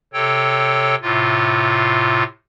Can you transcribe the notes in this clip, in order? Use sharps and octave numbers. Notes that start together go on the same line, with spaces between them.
C3 A4 C#5 G5
A2 C3 F4